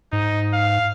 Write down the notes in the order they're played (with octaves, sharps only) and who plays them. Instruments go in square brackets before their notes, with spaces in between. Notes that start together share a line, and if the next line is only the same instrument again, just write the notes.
[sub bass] G#2 [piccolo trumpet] D#4
[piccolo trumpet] F5